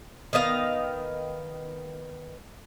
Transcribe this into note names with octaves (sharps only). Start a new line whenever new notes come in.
D#3 B3 D#5 F5